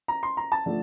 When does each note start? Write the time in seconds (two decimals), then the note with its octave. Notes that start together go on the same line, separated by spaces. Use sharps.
0.08 A#5
0.23 C6
0.37 A#5
0.52 A5
0.66 D3 F3 A3 D4